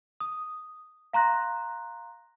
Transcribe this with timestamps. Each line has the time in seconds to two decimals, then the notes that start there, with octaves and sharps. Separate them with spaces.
0.20 D#6
1.13 F5 A#5 C6 F#6 A#6